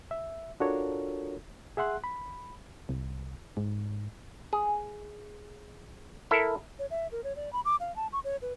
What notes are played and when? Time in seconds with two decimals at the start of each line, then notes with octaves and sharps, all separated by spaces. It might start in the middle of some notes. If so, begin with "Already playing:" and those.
0.11 E5
0.60 D4 F4 F#4 A4 A#4 C#5
1.77 G#4 E5 F#5 C6 F#6
2.04 B5
2.89 C2
3.57 G#2
4.53 G#4
6.31 E4 A4 A#4
6.79 C#5
6.91 E5
7.12 A#4
7.24 C#5
7.36 D5
7.53 B5
7.65 D6
7.80 F5
7.96 A5
8.13 C#6
8.24 C#5
8.42 B4